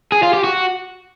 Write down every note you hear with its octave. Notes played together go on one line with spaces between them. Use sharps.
G#4
F4
G4
F#4